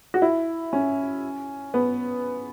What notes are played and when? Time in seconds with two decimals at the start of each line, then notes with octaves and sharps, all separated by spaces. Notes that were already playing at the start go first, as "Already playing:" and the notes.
0.14 F#4
0.22 E4
0.73 C#4
1.74 B3